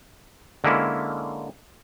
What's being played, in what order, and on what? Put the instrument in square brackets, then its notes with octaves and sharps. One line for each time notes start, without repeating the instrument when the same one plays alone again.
[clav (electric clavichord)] D3 G#3 A#3 C#4 E4